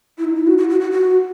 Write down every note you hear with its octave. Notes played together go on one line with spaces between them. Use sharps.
E4
D#4
E4
F#4
F#4
E4
F#4
F#4
F#4